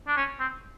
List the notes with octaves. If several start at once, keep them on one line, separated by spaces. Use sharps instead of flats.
D4
C#4
C4